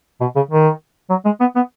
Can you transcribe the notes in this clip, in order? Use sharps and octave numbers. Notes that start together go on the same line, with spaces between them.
B2
C#3
D#3
F#3
G#3
B3
B3